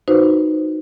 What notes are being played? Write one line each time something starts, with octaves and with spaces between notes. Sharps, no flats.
D#4 F#4 B4 C5